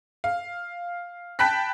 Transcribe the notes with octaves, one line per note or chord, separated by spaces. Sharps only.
F5
G5 A5 B5 F#6 B6